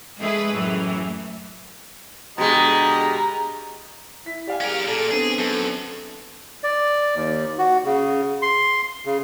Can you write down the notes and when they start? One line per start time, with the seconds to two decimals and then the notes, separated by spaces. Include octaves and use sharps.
0.18 G#3 A3 G#4 B4
0.53 F#2 A2 E3
2.38 B2 D3 G#3 G4 D#5 A#5
4.26 E4 B6
4.47 G4 D5 F5 G#5
4.61 C#4 G#4 A#4
4.88 A#2 A4
5.11 D3 B3 C4 G#4
5.38 F#2 A4
6.63 D5
7.15 D#2
7.59 F#4
7.85 C#3
8.42 C6
9.05 C#3